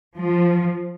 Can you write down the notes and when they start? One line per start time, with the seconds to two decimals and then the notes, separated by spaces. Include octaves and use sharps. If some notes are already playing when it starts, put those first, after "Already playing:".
0.17 F3